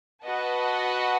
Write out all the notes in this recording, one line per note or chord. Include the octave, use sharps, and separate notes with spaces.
F#4 B4 D#5 F#5 A5